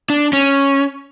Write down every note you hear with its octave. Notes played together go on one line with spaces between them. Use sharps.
D4
C#4